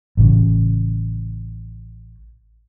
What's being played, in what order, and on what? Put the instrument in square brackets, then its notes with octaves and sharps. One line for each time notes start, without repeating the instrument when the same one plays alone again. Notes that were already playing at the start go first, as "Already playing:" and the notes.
[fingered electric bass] A1 C#3